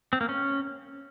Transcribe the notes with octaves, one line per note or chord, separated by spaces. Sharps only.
C4
A#3
C#4